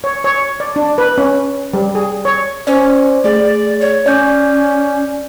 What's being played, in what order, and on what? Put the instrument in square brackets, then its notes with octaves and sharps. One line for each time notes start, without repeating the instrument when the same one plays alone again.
[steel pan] C#5
C#5
D5
D4
B4
C#4
G3
G#4
C#5
[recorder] C#4 [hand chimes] C5 D5
[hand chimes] A3 G#4 [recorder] D5
[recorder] C#5
[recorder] C#4 [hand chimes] D5 G6